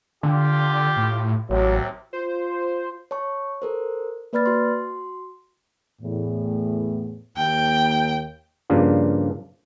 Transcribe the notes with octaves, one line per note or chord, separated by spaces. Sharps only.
D3 F4 G4
A2
A1 D#2 C3 F#3
F4 C5
C#5 A5 C#6
A4 A#4 C5
A#3 B4 D5 B5 F6 A6
F#4 C6
E2 A2
D#2 G5
G2 C#3 F3 A#3 D4 F4